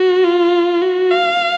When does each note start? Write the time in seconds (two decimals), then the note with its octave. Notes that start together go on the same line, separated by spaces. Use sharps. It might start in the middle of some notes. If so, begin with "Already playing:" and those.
Already playing: F#4
0.24 F4
0.82 F#4
1.11 F5